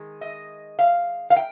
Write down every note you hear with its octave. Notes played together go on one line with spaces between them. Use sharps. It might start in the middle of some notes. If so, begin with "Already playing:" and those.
Already playing: D#3 G#3
D#5
F5
F5
G5